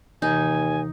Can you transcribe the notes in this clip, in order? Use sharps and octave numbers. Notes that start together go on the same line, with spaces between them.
D#2 C3 E3 D#4 G#5